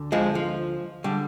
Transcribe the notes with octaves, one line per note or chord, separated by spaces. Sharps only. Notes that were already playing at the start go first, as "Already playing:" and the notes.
Already playing: D2 D3
F3 G#3
F3
D3 G3